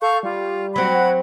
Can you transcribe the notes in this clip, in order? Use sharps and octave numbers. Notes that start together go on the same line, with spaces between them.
A4 F5 C#6 G6
G3 F4
F#3 C4 F#4 B5 G#6
F#5